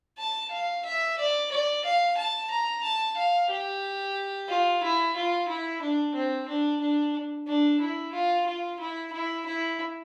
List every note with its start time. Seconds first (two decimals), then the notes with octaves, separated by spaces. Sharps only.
0.18 A5
0.51 F5
0.85 E5
1.18 D5
1.51 D5
1.84 F5
2.17 A5
2.50 A#5
2.83 A5
3.17 F5
3.50 G4
4.49 F4
4.83 E4
5.15 F4
5.48 E4
5.82 D4
6.14 C4
6.48 D4
6.81 D4
7.47 D4
7.80 E4
8.13 F4
8.46 F4
8.80 E4
9.12 E4
9.46 E4